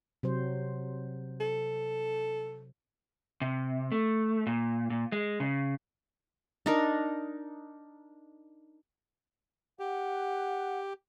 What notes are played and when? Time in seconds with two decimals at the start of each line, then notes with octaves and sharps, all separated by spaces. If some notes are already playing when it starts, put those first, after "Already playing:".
0.23 C3 F#3 C5
1.40 A4
3.42 C3
3.92 A3
4.47 A#2
4.90 A#2
5.12 G#3
5.40 C#3
6.66 D4 D#4 A#4
9.79 G4 F#5